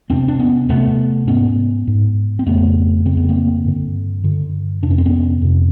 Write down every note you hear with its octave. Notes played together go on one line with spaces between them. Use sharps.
E2 C3 C4 D4
D4
B3 C#4
E2 C3 A3 B3
G#2 B3 C#4
G#2
C4
F2 C#3 A3 B3
F2 C#3 C4
B3
A#3 C4
G2 D3
G2 D3
F2 C3 D4
C#4
C4
B3 C#4
F2 C3